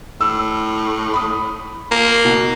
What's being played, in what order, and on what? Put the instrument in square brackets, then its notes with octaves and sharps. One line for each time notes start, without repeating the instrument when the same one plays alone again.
[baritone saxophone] A2 [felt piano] E6
[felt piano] B5 D#6
[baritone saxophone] A#3
[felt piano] B2